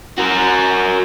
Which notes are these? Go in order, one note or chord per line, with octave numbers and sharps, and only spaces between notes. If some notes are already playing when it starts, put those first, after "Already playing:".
F#4 A#4